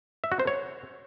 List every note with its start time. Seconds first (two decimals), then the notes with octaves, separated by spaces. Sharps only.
0.24 E5
0.32 F#4
0.39 C5
0.47 C#5